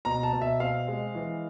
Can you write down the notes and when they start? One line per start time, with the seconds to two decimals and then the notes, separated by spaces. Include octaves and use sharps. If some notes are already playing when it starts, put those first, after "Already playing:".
0.05 B2 A#5
0.23 A5
0.33 B2
0.42 E5
0.60 C4 F5
0.88 G#3
1.15 E3